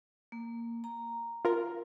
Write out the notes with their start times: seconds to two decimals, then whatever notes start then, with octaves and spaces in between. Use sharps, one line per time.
0.32 A#3
0.84 A#5
1.45 F4 A#4